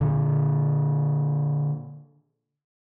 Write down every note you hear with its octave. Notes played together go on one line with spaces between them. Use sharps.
A#2 D3